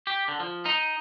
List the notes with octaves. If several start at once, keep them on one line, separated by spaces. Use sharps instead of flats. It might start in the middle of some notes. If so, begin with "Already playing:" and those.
G4
D3
F3
D#4